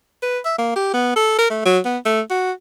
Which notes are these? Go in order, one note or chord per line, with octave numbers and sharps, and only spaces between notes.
B4
E5
A#3
G4
B3
A4
A#4
A3
F#3
B3
A3
F#4